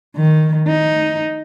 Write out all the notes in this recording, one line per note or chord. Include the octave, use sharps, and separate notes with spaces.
D#3
D#4